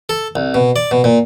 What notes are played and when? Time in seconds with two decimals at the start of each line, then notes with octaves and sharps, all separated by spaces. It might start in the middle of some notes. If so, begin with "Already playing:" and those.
0.09 A4
0.36 C2
0.54 B2
0.76 D5
0.91 B2
1.04 A#2